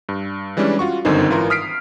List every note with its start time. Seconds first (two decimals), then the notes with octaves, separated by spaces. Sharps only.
0.09 G2
0.57 E3 G3 G#3 C#4 D4
0.79 F4 F#4 C#6
1.05 G1 F#2 D3 D#3 C4 D#4
1.30 G#1 E3 F4 A#4 C6
1.50 D#6 F6 B6 C7 D7